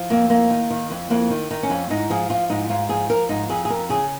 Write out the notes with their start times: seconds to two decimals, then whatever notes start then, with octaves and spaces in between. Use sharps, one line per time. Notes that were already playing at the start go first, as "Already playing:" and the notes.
Already playing: F3
0.10 F2 A#3
0.30 F2 A#3
0.50 D#3
0.70 D#3
0.90 F2
1.10 F2 A#3
1.30 D#3
1.51 D#3
1.63 C#4
1.70 F2
1.90 G#2 D#4
2.10 F3 G#4
2.30 F3 F4
2.50 G#2 D#4
2.69 G#2 F4
2.89 F3 G#4
3.10 F3 A#4
3.29 G#2 D#4
3.49 F2 G#4
3.65 G#4
3.69 F2 A#4
3.89 C#3 G#4